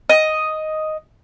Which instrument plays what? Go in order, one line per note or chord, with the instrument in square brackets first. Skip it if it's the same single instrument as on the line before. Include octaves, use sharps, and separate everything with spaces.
[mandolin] D#5